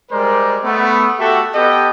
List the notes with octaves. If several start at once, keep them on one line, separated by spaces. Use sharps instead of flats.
G3 G#3 A#4 C5 D5
A3 B3
A3 F#4 G4 A4 E5
B3 G4 A4 D#5 G5